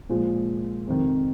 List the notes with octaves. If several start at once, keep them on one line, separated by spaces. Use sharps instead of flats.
A#2 F3 G#3
F2 C3 D#3